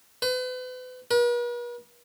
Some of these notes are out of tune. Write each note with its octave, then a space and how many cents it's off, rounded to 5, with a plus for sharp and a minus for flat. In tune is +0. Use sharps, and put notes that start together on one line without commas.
B4 +40
B4 -45